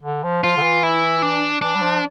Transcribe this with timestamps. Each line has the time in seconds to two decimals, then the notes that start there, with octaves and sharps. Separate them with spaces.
0.03 D3
0.23 F3
0.43 F3 F4
0.57 D3
0.62 E3
0.83 E4
1.22 D4
1.62 E3 D4
1.75 G3
1.82 F3